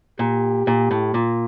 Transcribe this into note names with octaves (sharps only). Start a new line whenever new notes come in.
A#2 G4
A#2
A2
A#2 F4